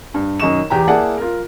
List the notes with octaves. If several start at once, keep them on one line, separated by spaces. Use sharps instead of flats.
G2
F#2 D#3 D#5 C#6 E7
E2 G4 A#5
A#3 E4 G#4 D5 F#5 A5
F4 A#4